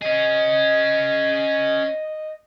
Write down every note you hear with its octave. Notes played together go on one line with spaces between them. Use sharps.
C#4 G#4 D#5